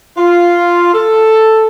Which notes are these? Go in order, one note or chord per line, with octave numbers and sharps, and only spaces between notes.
F4
A4